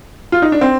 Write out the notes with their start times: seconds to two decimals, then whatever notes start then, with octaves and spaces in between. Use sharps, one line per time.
0.32 F4
0.42 D#4
0.52 D4
0.61 C4